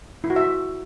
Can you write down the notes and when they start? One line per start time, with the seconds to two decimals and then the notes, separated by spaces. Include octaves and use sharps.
0.24 E4
0.30 F#4
0.36 E5